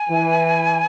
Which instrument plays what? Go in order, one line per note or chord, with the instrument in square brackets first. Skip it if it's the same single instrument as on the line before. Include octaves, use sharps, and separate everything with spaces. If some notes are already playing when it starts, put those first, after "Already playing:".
Already playing: [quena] G#5
[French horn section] E3